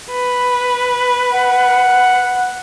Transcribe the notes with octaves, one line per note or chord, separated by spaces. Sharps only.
B4
F#5